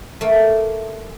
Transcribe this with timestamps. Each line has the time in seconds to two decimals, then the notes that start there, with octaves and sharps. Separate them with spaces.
0.21 A3 A#3